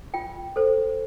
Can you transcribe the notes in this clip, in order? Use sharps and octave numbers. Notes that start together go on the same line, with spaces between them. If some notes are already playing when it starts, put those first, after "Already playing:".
F4 G5
A4 C5